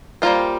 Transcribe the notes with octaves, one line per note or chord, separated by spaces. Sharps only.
G3 A#3 F4 C5